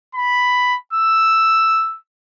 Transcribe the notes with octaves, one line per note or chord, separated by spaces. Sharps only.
B5
E6